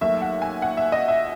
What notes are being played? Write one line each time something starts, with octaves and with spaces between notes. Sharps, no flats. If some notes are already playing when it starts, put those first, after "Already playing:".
D#2 D#3 F#3 A3 E5
F#5
G#5
F#5
E5
D#5
E5